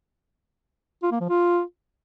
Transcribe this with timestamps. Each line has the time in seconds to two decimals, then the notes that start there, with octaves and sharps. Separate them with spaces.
1.03 F4
1.12 A#3
1.21 F3
1.29 F4